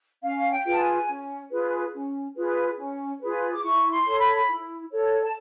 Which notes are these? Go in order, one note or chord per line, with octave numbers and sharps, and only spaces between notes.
C#4 F5
G5
F4 G#4 B4
A5
G#5
C#4
F4 G#4 B4
C#4
F4 G#4 B4
C#4
F4 G#4 B4
D6
E4 C#6
C6
A4 C#5
B5
E4
A4 C#5
A5